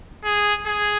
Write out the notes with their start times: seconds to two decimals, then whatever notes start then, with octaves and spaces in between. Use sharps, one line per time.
0.25 G#4
0.67 G#4